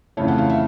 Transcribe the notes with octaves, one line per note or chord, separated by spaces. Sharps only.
F2 C#3 E3 A3 C#5
F#5
F5
E5